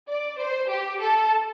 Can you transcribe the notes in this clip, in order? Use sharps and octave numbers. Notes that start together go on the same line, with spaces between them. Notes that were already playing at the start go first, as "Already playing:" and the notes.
D5
C5
G4
A4